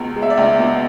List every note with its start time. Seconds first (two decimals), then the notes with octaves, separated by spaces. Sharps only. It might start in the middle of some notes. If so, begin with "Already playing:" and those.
Already playing: C#2 B2
0.16 G#3
0.22 E5
0.30 D5
0.37 C#2
0.58 B2